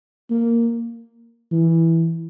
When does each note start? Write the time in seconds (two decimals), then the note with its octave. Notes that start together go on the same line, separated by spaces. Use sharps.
0.30 A#3
1.52 E3